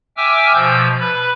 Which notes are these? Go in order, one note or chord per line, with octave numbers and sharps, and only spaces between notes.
E5 G5 G#5 D6 E6 F6
B2 F3 E6 G6
B4 B5